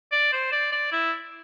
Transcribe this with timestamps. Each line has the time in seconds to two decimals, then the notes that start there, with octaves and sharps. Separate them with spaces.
0.12 D5
0.33 C5
0.52 D5
0.72 D5
0.92 E4